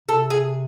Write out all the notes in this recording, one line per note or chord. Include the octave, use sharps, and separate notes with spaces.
C3 A4
G#4